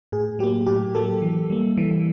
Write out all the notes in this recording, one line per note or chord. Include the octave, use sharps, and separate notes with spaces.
A2 G#4
F#3 A#3 G4
A2 G4
F#3 A#3 A4
E3
G3 A#3
E3